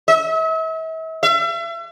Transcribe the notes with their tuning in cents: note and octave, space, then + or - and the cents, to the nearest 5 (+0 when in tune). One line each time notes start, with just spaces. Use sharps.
E5 -40
E5 +40